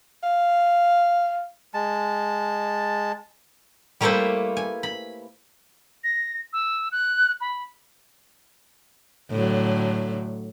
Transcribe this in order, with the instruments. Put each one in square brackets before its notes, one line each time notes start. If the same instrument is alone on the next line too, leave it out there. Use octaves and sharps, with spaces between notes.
[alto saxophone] F5
[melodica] G#3 A5
[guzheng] G3 A3 A#3 E4 B4 C5
G#5
B5
[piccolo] A#6
E6
F#6
B5
[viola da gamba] A2 D3 F#3